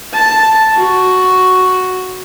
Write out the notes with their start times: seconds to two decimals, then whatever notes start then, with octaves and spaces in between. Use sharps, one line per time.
0.14 A5
0.74 F#4